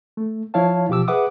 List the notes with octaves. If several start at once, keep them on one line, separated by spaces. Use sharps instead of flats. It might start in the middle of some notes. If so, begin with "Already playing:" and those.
A3
F3 E4 C#5 F5 A5
B2 F3 G4 D6 E6
G#4 B4 E5 F#5 D6 D#6